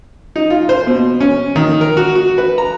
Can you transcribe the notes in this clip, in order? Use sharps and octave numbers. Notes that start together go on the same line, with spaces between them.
D#4
F4
C5
B2
C#4
D#3
A#4
F#4
F#4
B4
A#5